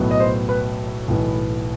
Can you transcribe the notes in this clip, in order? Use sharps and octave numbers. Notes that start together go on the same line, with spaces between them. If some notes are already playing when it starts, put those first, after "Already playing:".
Already playing: B1 A2 F#3 B3
D#5
C5
B4
B1 A2 E3 B3